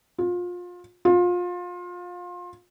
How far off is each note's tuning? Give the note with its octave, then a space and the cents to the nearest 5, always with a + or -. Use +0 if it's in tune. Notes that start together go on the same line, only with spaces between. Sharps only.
F4 +25
F4 +25